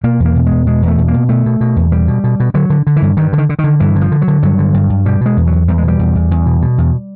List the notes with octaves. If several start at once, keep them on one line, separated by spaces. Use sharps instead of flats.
B2 A#3
E2
A#3
B2
E2 G#3
B2 G#3
E2
A3
B2
A#3
B2
B2 A3
B2
B2
E2
B2 G3
B2
B2
B2
D3 F#3
D3
D3
E3
G2
G2 D#3
D3
D#3
D3
D#3
D3
G2 E3
D3
F3
D3
F#3
D3
G2 F#3
D3
G2
G2
B2 G3
B2 G#3
E2
F#3
E2
E2 G3
G#3
B2 G3
E2
E2
E2
B2
B2
E2